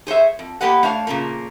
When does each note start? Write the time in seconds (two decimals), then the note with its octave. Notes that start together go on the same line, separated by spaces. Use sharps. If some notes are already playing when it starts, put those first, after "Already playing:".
0.07 G#4 C5 C#5 E5
0.39 F2
0.61 A#3 B3 G4 B4 D#5 F#5
0.83 A3 D4 C#5 F5
1.07 A#2 C#3 F3 A#3